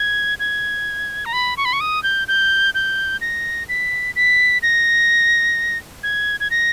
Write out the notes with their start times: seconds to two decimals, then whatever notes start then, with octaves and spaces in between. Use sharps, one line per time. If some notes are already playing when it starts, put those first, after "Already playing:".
Already playing: G#6
0.40 G#6
1.25 A#5
1.33 B5
1.57 C#6
1.65 B5
1.73 C#6
1.81 D#6
2.03 G6
2.28 G6
2.75 G6
3.21 A#6
3.69 B6
4.16 B6
4.63 A#6
6.03 G#6
6.40 G#6
6.51 A#6